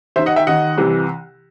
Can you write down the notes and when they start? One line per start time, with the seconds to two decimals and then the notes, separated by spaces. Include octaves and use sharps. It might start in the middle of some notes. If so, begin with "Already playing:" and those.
0.16 D#2 C5 E5
0.19 D#3
0.26 D#5 F#5
0.36 E5 G5
0.47 D#2 D#3 D#5 F#5
0.78 C2 C3 E3